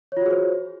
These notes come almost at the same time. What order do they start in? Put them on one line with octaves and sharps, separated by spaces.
C#5 F4 F#4 G#4 C5